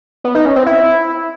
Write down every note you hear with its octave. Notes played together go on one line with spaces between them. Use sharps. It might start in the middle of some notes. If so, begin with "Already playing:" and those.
B3
D#4
C#4
C4
E4